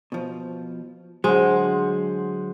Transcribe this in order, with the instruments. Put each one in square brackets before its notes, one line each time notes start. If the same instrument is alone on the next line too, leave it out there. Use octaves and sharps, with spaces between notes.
[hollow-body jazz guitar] B2 F3
[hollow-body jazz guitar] D3 F#3 [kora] G#3 [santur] C5 F#5